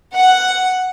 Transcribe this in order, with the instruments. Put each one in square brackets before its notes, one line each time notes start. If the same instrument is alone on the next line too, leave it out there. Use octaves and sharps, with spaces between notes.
[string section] F#5